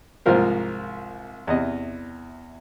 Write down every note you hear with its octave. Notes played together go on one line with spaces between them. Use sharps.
C2 G#2 F3 F4 A#4 C5
E2 C3 D#5